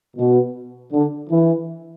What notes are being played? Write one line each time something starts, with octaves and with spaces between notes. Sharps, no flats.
B2
D3
E3